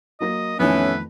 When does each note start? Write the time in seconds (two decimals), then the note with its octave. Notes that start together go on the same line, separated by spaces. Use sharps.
0.20 F#3 A#3 D#5 A#6
0.59 F2 A2 D#3 E3 A3 B3 C#4 B4